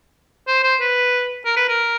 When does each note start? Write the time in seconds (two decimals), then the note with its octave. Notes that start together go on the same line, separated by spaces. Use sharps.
0.48 C5
0.63 C5
0.81 B4
1.45 A#4
1.56 B4
1.69 A#4